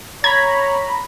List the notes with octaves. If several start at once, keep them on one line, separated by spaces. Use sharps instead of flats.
C#5 A#5 B5 G#6